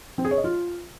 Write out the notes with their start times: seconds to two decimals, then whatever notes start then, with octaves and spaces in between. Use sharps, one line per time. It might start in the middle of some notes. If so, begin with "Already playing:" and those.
0.18 C4
0.25 G#4
0.31 C#5
0.38 D#5
0.44 F4